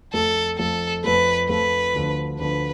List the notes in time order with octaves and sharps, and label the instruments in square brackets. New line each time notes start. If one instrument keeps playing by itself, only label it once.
[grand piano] F2 F3 A3 [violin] A4
[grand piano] F2 F3 A3 [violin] A4
[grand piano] F2 F3 A3 [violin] B4
[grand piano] F2 F3 A3 [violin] B4
[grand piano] D2 D3 F3
[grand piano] D2 D3 F3 [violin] B4